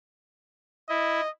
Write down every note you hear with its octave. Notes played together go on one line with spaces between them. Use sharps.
E4 D#5